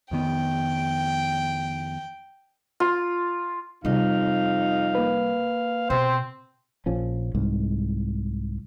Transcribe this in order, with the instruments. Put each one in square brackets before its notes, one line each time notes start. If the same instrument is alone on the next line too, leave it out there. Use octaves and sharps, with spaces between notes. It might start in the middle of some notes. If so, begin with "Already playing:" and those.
[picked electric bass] F2 D#3 B3 [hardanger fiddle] G5
[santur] F4
[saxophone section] F2 D#4 [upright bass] C3 G3 [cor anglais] F5
[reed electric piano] A#3 B4
[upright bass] B2 [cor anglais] C4 [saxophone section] C5
[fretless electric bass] A#1 F3 C#4
C2 G#2